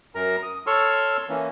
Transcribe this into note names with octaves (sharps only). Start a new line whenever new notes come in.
F#2 A#4 A#5
D#6
A4 C#5 C6 C#6 E6 F6
E3 A#3 C#4